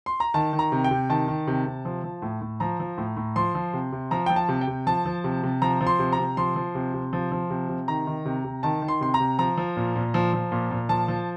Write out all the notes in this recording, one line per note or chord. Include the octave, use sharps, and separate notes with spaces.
C6
A#5
D#3 A5
D#3
A#5
C3
G5
C3
D#3 A5
D#3
C3
C3
F3
F3
A2
A2
F3 A#5
F3
A2
A2
F3 C6
F3
C3
C3
F3 A#5
F3 G5
A5
C3
G5
C3
F3 A5
F3
C3
C3
F3 A#5
F3
C6
C3
A#5
C3
F3 C6
F3
C3
C3
F3
F3
C3
C3
D#3 A#5
D#3
C3
C3
D#3 A5
D#3
C6
C3 C6
A#5
C3
F3 A#5
F3
A#2
A#2
F3
F3
A#2
A#2
F3 A5
F3